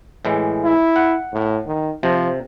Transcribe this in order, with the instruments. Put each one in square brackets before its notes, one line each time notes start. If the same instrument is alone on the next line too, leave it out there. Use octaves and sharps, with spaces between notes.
[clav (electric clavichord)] A2 E3 G#3
[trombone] E4
[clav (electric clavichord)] F#5
[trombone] A2
D#3
[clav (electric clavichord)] C3 [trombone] F3